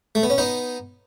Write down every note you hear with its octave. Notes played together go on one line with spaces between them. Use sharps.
A3
B3
C#4
B3 D#4